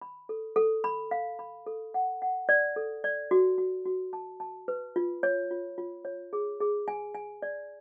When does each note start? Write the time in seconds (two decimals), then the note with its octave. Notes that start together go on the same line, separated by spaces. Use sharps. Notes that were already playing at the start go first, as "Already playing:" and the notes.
0.02 B5
0.29 A4
0.56 A4
0.84 B5
1.11 F5
1.39 B5
1.66 A4
1.94 F#5
2.22 F#5
2.49 D5
2.76 A4
3.04 D5
3.31 F#4
3.58 F#4
3.86 F#4
4.13 A5
4.40 A5
4.68 B4
4.96 F4
5.23 C#5
5.51 F4
5.78 F4
6.05 C#5
6.33 G#4
6.60 G#4
6.88 G#5
7.15 G#5
7.42 D5